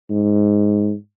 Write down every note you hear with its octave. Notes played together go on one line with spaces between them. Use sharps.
G#2